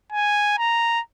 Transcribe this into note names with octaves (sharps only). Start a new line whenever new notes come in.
G#5
A#5